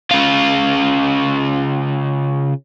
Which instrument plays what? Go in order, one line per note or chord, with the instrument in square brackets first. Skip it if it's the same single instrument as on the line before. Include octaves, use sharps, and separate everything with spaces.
[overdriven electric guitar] C#3 F4